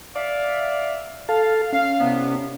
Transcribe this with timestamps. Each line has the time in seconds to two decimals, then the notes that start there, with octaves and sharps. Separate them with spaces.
0.16 D5 E5 F5
1.29 A4 F5 A5
1.73 C#4 F5
2.00 C2 C3 B3